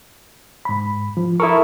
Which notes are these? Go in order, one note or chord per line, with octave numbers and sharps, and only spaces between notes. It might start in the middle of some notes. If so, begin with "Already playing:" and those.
G#2 B5
F3
E4 A4 A#4 C#6 D#6